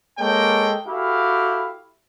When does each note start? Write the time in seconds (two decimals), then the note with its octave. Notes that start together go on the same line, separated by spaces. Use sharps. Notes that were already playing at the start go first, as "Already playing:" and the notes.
0.18 G#3 A#3 A4 C#5 G5
0.86 E4 F#4 G4 A4 F5